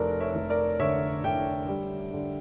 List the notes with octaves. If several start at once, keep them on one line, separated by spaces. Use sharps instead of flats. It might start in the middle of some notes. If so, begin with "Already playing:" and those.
Already playing: F1 A#4 D5
C#5 E5
F1
A#4 D5
D3 C#5 E5
D3 E5 G5
G3
D3